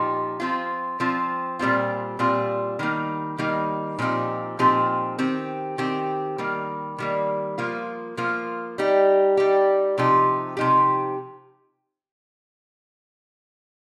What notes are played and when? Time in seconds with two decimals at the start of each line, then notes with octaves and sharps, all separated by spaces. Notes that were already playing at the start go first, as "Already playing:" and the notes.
Already playing: A#2 F3 D#4 G4
0.40 F3 C4 F4
1.00 F3 C4 F4
1.59 A#2 G3 C4 F4
2.19 A#2 G3 C4 F4
2.79 D#3 G3 A#3 D#4
3.38 D#3 G3 A#3 D#4
3.99 A#2 F3 C4 D#4 G4
4.59 A#2 F3 C4 D#4 G4
5.19 D#3 C4 G4
5.78 D#3 C4 G4
6.38 D#3 G3 A#3
6.98 D#3 G3 A#3
7.58 F3 A#3 F4
8.17 F3 A#3 F4
8.78 G3 D#4 G4
9.37 G3 D#4 G4
9.98 C3 F3 D#4 G4
10.57 C3 F3 D#4 G4